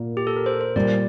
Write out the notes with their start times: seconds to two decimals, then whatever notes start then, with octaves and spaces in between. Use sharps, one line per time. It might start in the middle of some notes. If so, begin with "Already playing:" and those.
Already playing: A#2 A#3
0.17 G4
0.27 A4
0.36 A#4
0.46 C5
0.61 C5
0.76 A#2 G3 A#3 D5